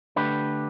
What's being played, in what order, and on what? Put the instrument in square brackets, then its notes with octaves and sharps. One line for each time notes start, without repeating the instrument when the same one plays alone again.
[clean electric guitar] D3 A3 D4 G4 B4